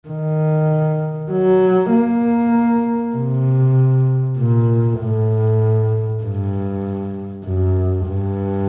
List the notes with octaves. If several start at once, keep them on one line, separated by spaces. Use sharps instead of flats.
D#3
F#3
A#3
C3
A#2
A2
G2
F#2
G2